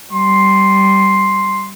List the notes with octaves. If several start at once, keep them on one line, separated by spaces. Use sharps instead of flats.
G3 C6